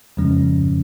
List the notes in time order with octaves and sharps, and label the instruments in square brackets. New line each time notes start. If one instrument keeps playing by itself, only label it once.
[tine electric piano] F2 C#3 F3 G#3 C#4